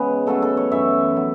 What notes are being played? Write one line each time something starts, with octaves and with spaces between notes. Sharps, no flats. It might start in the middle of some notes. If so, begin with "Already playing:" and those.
Already playing: C#3 G#3 B3 B4
C#3 F#3 A3 A4
A4
C#5
F#2 E3 B3 E5
D#3 F#3